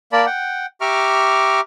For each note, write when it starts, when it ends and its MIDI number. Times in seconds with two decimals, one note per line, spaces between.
0.12 0.26 58
0.12 0.26 70
0.12 0.26 74
0.12 0.26 81
0.12 0.26 83
0.26 0.66 78
0.26 0.66 79
0.81 1.60 67
0.81 1.60 76
0.81 1.60 82
0.81 1.60 85
0.81 1.60 86
0.81 1.60 89